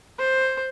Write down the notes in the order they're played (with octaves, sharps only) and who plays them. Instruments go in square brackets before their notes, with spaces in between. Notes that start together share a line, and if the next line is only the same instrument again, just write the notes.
[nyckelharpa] C5